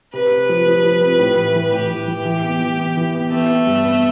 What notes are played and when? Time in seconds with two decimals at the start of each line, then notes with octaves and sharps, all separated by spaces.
0.13 C3 B4
0.32 C3
0.49 F3
0.67 F3
0.84 F3
1.01 C4
1.19 A2
1.37 E3
1.55 E3
1.72 A2 G4
1.91 E3
2.08 E3
2.25 E3
2.44 B3
2.61 E3
2.79 B3
2.97 E3
3.14 B3
3.31 A3 B3
3.49 B3
3.67 G2
3.85 B3